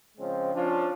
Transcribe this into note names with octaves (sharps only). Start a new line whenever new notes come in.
C#3 F3 G#3 C4
F3 C#4 D4 F4